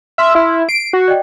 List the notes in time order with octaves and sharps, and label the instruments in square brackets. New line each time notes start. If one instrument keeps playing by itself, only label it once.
[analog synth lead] E5 [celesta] C6 F6
[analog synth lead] E4
[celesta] C7 [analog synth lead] D7
[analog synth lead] F#4
[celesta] D5 D#5 G5